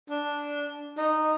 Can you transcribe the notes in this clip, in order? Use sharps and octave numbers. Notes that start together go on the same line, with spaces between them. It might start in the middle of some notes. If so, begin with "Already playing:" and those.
D4
D#4